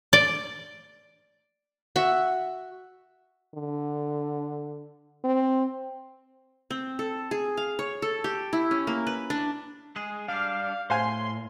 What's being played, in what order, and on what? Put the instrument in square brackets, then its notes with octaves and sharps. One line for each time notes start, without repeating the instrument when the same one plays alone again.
[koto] D5
[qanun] F#4 E5
[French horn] D3
C4
[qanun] C4
A4
G#4
F5
C#5
A4
G4
E4
C#4
A#3
B4
D4
[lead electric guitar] G#3 G#4
[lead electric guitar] G3 D4 [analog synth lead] F5
[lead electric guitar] A2 [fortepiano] C5 F5 G#5 [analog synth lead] C6